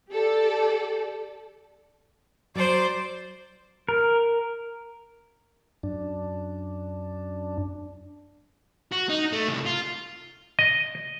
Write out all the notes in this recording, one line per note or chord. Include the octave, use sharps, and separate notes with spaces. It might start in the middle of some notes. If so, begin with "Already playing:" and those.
G4 A4 D5
F#3 C5 D5
A#4
F#2 D4
F#4
D#4
A3
C2
F4
D#5